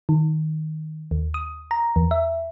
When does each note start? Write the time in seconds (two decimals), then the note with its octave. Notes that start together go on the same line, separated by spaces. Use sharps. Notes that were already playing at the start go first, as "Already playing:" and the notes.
0.09 D#3
1.11 D#2
1.34 D#6
1.71 A#5
1.96 E2
2.11 E5